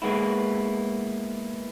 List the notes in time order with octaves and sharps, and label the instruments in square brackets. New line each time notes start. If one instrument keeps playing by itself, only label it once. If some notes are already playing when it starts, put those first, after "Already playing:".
[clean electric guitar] G#3 A#3 B3 E4